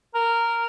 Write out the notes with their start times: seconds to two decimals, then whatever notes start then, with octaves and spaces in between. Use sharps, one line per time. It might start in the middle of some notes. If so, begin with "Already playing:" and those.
0.14 A#4